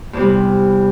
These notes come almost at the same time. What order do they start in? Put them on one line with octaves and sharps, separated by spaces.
E2 C3 G3